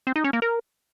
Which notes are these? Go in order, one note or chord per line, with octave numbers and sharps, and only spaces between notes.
C4
D#4
C#4
A#3
A#4